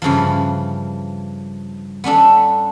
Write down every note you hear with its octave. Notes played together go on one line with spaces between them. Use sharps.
G2 C#3 E3 F3
B3 C#4 D4 A4